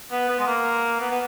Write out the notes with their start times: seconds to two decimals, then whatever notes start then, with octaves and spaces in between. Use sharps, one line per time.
0.11 B3
0.29 B3
0.39 G#3
0.47 A#3
1.01 B3
1.11 B3